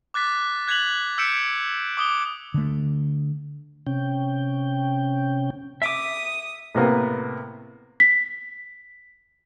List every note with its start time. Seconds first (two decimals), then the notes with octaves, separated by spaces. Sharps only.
0.14 D6 F#6 A6 B6
0.68 F#6 G#6 B6 F7 F#7
1.18 E6 G6 B6 C#7 D7 E7
1.97 D6 D#6 G7
2.54 D3 A3
3.87 C3 C#4 G5
5.82 E5 D6 D#6
6.75 A2 C3 A#3 B3
8.00 B6